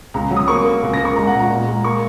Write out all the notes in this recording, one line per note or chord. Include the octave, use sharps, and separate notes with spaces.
C#2 A#5
F#3
D#6
A#3 C#6
A#3
C#2
A#6
A#3
C#6
G#3 A#5
F#5
A#2
A#5
A#2
G#3
A#3 C#6